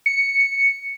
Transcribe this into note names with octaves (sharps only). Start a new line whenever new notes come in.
C#7